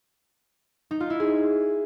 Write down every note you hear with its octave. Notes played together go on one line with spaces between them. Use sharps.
D#4
F4
E4
G#4